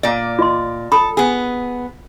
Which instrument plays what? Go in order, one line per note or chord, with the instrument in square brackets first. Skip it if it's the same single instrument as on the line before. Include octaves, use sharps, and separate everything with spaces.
[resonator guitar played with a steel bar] A#2 D5
[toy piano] F4 D#5 C6
[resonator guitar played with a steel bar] A4 [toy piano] B5 D#6
[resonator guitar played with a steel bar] B3 G#4